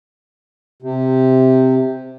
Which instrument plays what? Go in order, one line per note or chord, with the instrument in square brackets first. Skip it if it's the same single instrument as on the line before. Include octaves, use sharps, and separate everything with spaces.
[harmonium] C3